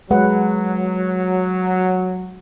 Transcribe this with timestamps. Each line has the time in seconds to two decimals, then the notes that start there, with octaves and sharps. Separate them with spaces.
0.11 F#3 G#3 B4 F#5